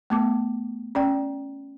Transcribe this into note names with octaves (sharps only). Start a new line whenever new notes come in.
A3 B3 D6
C#4 D5 G5